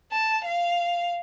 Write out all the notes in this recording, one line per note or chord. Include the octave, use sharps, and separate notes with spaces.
A5
F5